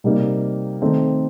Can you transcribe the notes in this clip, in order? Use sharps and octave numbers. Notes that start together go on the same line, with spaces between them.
C3 G3 A#3 D#4
D#3 A3 C4 D#4